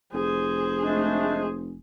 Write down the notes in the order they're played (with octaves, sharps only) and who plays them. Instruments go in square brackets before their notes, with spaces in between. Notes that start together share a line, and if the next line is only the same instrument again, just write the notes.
[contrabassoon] F1 [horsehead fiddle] G#4 C5
[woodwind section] G#3 A3 D4